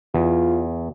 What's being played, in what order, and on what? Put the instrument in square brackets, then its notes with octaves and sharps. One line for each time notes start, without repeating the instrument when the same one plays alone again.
[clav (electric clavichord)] E2 [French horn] F4